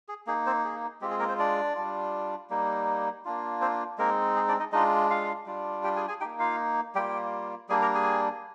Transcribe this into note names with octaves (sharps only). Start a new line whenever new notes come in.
G#4
A#3 D#4 G#4
C4 C5
G#4
G#3 C4 F4 G4
G#4
A#3 A#4
C4 C5
D4 D5
G3 D4 F4
G3 A#3 D#4
A#3 D4 F4
C4 C5
G#3 A#3 C4 D#4 A#4
G#4
D4 D5
D#4 D#5
G#3 D4 D#4 F4 D#5
F4 F5
G3 D4 F4
G4 G5
G#4 G#5
G#4 G#5
A#3 D#4 G4 G5
F4 F5
G3 A#3 F4 G4 G5
G3 A#3 D4 G#4 G#5
A#4 A#5
G#4 G#5